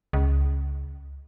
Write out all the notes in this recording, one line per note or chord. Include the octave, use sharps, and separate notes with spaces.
C#2